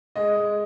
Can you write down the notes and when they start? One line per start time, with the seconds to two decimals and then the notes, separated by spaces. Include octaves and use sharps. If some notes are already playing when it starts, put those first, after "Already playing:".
0.16 G#3 D#5
0.36 G#3